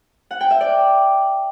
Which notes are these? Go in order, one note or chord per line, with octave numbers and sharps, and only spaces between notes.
F#5
G5
E5
D5